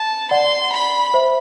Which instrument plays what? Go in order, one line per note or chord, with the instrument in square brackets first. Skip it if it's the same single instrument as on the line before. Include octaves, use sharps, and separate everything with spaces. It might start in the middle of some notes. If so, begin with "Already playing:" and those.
Already playing: [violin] A5
[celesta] D5 F#5 [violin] C6
[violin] B5
[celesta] C5 E5